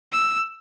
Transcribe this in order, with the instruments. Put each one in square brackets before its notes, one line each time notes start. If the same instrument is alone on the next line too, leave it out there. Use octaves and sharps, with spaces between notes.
[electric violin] E6